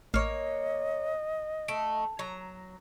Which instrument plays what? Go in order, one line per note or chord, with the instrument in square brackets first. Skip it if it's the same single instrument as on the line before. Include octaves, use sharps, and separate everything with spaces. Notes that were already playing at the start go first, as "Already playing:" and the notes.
[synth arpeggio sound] A1 F6 [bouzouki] A#3 C#5 [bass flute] D#5
[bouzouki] A3 [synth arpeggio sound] D7
[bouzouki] F#3 A#5